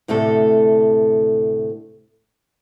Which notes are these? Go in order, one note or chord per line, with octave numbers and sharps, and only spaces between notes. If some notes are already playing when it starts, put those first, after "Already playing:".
D2 A2 C3 A3 A4